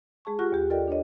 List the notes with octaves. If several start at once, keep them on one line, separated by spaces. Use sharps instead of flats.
G#3 G#4 A5 C#6
F4 G4 F#5 C#6 F#6 A#6
D#2 G4
F4 A4 A#4 D5 D#5 G5
D4 A4 C#5 D#5